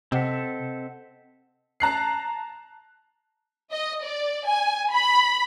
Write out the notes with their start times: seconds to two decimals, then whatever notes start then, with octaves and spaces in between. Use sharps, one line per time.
0.12 C3 C4 A4 D#5 F#5 B6
1.80 A5 A#5 F#6 C7
3.72 D#5
4.04 D5
4.46 G#5
4.92 B5